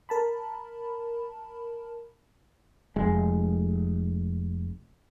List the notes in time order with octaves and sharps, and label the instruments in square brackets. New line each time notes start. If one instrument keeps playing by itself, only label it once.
[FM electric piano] A#4 A5 B5
[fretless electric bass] F1 G#3